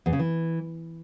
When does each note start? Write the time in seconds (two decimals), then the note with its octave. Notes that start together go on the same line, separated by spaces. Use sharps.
0.06 E2
0.13 C#3
0.19 E3